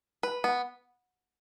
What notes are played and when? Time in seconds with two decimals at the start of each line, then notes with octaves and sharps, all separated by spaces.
0.23 B4
0.44 B3